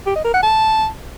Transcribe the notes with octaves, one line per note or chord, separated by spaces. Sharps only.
G4
D#5
A#4
F#5
A5